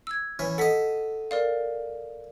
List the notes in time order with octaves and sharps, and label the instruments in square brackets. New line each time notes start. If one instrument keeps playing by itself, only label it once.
[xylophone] E6 G#6
[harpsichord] E3 C#4
[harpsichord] A4 D#5 [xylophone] F#5 B6
[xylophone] A#4 D5 F5